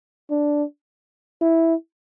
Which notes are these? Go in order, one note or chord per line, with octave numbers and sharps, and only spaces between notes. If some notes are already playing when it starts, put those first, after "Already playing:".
D4
E4